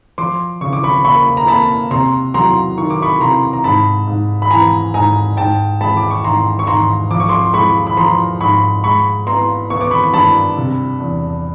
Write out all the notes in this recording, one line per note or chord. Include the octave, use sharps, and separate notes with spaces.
F3 C6 D6
C#3 C#6
D6
B5 C#6
A#3 B5 C#6
A#5
A#3 A5 B5
C3 A#5 C6
F#3 A#5 C6
D#3 C#6
D6
B5 C#6
C3 A#5 C6
A#5
G#2 A5 B5
G#2
B5
E3 G#5 A#5
G#2 G#5 A#5
G#2 G5 A5
G#3 A5 B5
D6
C#6
G#2 A#5 C6
C#6
G#2 A#5 C6
F3 D6
C#6
C6 D6
G#3 B5 C#6
B5
F3 A#5 C6
G#2 B5 C#6
G#3 B5 C#6
B3 A#5 C6
B3 C#6
D6
B5 C#6
G2 A5 B5
C3
E2